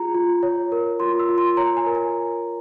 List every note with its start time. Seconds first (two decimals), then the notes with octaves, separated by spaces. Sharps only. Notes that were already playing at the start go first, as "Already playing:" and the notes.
Already playing: F4 G#4 A#5
0.14 F4
0.43 C#5
0.72 A#4
1.00 F4 C6
1.19 E6
1.29 F4
1.38 C6
1.57 C#5 A#5
1.77 G#5
1.86 A#4
1.95 G#5